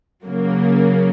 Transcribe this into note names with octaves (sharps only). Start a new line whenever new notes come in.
C#3 F#3 A#3